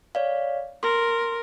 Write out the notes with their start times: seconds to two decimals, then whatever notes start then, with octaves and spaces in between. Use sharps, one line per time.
0.15 C#5 D5 F5
0.83 A#4 C6